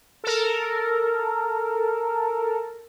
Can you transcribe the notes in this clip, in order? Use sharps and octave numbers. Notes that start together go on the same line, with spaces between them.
A4 A#4